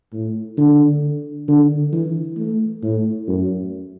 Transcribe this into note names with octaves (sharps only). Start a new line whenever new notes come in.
A2
D3
D3
E3
A3
A2
F#2